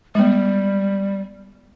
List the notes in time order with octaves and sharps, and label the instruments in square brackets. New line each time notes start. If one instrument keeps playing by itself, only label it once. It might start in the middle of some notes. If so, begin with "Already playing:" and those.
[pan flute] G3 [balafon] G#3 B3